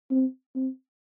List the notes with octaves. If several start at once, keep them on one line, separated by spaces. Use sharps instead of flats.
C4
C4